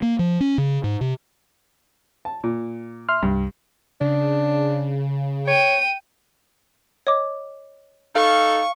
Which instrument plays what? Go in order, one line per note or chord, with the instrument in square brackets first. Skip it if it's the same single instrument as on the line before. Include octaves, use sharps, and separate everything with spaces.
[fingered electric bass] A#3
F3
C#4
C#3
G#2
C3
[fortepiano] A5
A#2
[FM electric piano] E5 C6 F6
[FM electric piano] C2 [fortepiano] G2
[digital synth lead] C#3 [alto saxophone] D4
[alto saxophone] C#5 [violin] G5 D#7
[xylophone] C#5 D#5 D6
[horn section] D#4 A4 [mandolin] F5 [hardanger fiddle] C#6